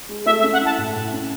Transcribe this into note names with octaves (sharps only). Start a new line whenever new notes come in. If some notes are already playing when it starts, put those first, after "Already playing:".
G#3
A3 E5
E5
C#4
F#5
E4 A5
A2
A2
C#4